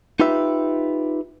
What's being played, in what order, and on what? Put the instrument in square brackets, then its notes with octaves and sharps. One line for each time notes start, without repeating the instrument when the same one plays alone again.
[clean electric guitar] D#4 F4 G4 B4 E5